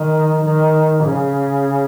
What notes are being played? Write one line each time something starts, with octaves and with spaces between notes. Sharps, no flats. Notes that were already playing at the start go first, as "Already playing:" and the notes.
Already playing: D#3
D#3
C#3